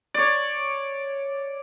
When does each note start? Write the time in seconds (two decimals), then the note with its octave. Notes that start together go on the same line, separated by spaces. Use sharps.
0.14 C#5 D5